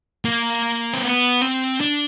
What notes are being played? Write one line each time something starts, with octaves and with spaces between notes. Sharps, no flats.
A#3
C4
B3
C4
D4